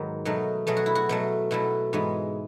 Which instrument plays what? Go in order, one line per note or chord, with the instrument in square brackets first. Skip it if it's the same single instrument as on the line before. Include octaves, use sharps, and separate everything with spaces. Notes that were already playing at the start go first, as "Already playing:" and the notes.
Already playing: [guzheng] G#2 D#3 F#3 B3 D#4
B2 F#3 A3 D#4
B2 F#3 A3 G#4
F#4
E4
F#4
B2 F#3 A3
B2 F#3 A3 E4
G#2 E3 G#3 B3